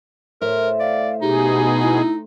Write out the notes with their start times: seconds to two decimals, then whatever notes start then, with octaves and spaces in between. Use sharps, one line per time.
0.41 A2 A#4 C5 E5
0.80 D5 F5
1.21 B2 D#4 G4 G#4
1.81 E4